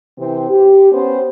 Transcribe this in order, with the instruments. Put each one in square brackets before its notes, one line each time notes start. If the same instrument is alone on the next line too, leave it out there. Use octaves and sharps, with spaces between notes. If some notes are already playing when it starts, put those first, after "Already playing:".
[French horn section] C3 E3 C4
G4
B3 C#4 C5